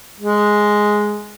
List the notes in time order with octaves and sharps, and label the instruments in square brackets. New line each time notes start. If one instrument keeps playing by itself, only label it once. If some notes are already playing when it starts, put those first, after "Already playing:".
[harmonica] G#3